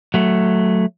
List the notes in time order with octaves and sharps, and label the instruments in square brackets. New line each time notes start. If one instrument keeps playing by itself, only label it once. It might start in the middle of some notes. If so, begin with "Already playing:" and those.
[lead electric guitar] F#3 A3